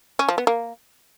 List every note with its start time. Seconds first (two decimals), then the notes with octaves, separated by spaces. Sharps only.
0.19 C#4
0.29 F3
0.38 B3
0.47 A#3